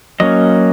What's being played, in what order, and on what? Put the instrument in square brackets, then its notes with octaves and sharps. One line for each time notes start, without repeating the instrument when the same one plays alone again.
[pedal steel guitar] F#3 A#3 C#4 D#5